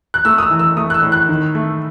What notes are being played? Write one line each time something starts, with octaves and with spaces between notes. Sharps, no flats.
F#6
A3 E6
D#6
E6
E3
E6
A3 D#6
F#6
E6
A2
F#6
D#3
A3